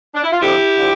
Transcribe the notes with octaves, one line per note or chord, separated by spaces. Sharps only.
D4
E4
F4
F2 D3 F3 E4 G4
D3 F3